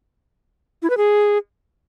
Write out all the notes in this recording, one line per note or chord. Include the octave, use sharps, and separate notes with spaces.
E4
B4
G#4